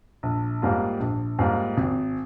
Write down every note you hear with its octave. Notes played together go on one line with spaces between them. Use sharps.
A#1
G#2 G3 A#3 F4
A#1
G#2 G3 A#3 F4
G#1